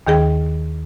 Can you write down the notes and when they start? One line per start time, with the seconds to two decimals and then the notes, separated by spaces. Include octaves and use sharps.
0.07 D#2 D#3 G#4 G5